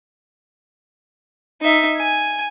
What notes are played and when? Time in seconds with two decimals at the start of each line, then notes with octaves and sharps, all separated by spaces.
1.61 D#4 E5
1.98 G#5